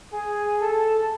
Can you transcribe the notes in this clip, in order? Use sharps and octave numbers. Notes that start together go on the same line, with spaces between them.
G#4 G#5
A4 A5